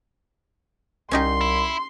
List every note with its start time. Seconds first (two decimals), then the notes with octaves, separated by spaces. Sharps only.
1.11 C2 C#4 D#4 G4 C6
1.41 E4